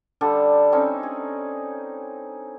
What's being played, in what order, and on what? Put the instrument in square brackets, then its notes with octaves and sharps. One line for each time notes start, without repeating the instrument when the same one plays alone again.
[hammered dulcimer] D3 G3 A4 A5
C4 C#4 D#4 A4
G#4